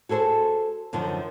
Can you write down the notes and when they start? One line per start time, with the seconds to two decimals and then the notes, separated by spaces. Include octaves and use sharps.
0.09 F#4 G#4 A4 B4 C5
0.93 F#2 D3 D#3 F3